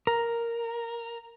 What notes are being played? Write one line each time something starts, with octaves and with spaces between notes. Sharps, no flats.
A#4